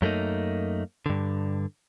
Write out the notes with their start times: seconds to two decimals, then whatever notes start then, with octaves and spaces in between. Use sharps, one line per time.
0.02 F#2 A3 A#3 D#4
1.06 G2 D3